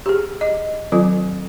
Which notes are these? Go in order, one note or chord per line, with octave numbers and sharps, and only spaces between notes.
G4 G#4
D#5
D#3 F#3 C4 F4 A4